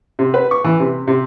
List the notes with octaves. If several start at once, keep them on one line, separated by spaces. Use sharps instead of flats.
C3
B4
C#6
E3
C3
C3